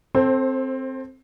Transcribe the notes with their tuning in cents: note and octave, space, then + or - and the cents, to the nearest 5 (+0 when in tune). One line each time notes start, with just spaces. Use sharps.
C4 +0 A4 +0 C5 +25